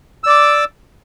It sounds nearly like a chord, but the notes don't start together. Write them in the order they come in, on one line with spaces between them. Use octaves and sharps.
E6 D5 D6